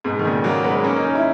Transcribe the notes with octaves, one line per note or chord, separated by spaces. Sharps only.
G#2 B2
D#3
A#2 C#3
F#3 A#3
G#3 B3
B3
A#3 C#4
D#4
A#3 C#4
E4